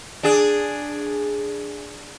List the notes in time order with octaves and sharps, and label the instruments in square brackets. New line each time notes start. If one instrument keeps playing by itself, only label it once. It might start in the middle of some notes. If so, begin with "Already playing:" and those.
[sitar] D4 G#4